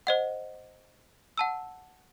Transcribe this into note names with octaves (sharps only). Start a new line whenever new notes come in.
C5 D#5 F#5
F#5 A5 E6